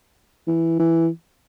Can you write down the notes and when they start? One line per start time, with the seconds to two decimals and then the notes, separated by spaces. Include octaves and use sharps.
0.47 E3
0.79 E3